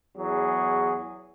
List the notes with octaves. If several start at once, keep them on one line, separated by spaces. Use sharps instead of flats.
E2 F#3 G#4